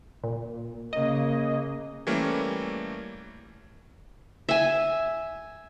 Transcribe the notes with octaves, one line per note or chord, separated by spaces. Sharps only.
A#2
C#3 A#3 D#5
E3 G3 A3 A#3 C#4
E5 G#5